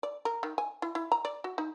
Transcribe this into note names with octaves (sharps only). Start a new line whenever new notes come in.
D5
A#4
D#3
G#5
E4
E4
A#5
D5
F#4
D#4